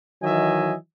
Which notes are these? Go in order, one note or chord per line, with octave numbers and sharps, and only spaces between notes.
D#3 E3 F#3 D#5 E5 G#5